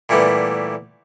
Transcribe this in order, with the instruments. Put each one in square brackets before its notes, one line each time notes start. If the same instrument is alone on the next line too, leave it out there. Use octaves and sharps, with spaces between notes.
[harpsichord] A#2 E3 G3 A3 B3